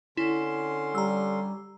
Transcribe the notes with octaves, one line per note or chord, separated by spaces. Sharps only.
D3 C#4 E4 C6
G3 A#5 E6